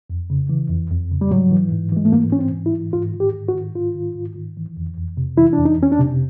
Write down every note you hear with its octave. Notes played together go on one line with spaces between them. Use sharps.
F2
C#3
E3
F2
F2
C#3
G3
G#2 F#3
E3
G#2
E3 G#3
A3
G#2 A#3
E3 C#4
C4
G#2
E4
E3
G#2 F4
D#3
G4
G#2
F#4
D#3
G#2 F4
D#3
G#2
D#3
E3
F2
F2
C3
E3 E4
D4
F2
D#4
F2 C#4
D4
C3